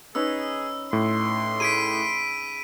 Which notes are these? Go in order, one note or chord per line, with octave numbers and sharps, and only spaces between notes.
C#4 D#4 G#4 B4 E6
A2 C6
G#4 B5 B6 D7 D#7